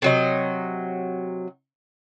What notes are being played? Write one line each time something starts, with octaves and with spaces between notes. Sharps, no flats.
C3 F#3 D#5